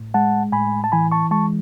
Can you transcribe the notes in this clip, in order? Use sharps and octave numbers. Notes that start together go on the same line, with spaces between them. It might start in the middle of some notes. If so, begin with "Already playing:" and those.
Already playing: A2
G#3 F#5 A5
A2 G#5 B5
A5
E3 G#5 B5
A5 C#6
G#3 A5 C#6